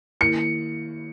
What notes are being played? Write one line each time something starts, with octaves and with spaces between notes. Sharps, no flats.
D#3 A#3 E4 A#4 C#7